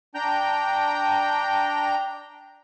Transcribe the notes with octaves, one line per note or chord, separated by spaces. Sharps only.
D4 G5 A#5 G6